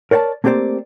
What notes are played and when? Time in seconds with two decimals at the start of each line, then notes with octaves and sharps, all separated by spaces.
0.11 A#4 C#5 D5 F#5 A5
0.44 A3 A#3 C4 G4 C5 D5